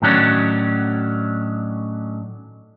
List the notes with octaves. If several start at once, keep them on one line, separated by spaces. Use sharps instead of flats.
A2 D#3 F#3 C#4 D4